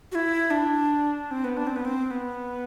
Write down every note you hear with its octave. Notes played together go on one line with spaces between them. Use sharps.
F#4
E4
D4
C4
B3
D4
C4
B3
C4
B3